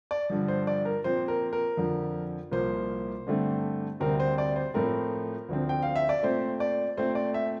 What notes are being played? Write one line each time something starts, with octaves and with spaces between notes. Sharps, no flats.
D5
G2 D3 F3
C5
D5
A#4
A#2 F3 C4 C5
A#4
A#4
F2 D3 F3
C2 A#2 F3 A#3 C5
G2 D3 A3 C4
D2 C3 G3 C4 A#4
C5
D5
C5
A2 F3 A3 C4 A#4
D2 D3 F3 C4
G5
F5
E5
D5
A#2 A3 C4 C5
D5
A#2 A3 C4 C5
D5
E5